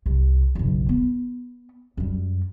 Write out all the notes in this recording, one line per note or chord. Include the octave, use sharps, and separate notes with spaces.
C2
F#1 B1
B3
F#2 G3